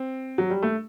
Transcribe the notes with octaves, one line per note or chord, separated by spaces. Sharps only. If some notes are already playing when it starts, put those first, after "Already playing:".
Already playing: C4
F#3
G3
A3